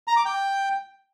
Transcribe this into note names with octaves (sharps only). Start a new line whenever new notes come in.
A#5
D6
G5